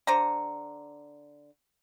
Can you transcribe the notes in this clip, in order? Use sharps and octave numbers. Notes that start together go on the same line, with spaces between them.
D3 C5 A#5